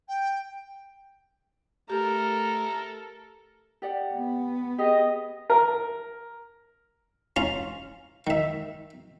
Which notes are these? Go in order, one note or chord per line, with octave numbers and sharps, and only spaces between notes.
G5
A3 G4 A4 A#4 A#5
G4 D5 F#5
B3
G4 G#4 D#5
A#4
C#4 F4 A#5
D#3 E5